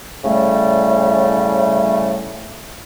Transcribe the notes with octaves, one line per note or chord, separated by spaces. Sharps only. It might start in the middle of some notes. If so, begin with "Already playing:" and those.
A2 C#3 G3 A3